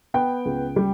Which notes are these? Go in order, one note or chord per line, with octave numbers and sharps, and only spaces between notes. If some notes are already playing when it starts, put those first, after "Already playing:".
B3 G5
C#2
G3